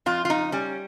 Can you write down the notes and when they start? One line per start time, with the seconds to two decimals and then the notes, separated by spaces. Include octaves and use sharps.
0.06 F2 F4
0.25 F4
0.30 D#4
0.52 G3 C#4